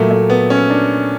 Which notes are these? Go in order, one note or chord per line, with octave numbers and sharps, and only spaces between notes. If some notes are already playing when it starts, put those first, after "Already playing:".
Already playing: A#2 F#3 A3
A3
B3
C#4
D4